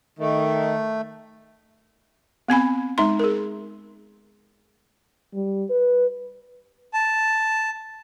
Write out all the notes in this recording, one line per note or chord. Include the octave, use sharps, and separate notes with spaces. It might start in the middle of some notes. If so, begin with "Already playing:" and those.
D#3 A3
B3 C4 G#5 B5
G#3 D#4 C6
G#4 A#4
G3
B4
A5